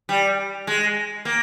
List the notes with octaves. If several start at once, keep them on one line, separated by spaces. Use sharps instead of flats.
G3
G#3
A#3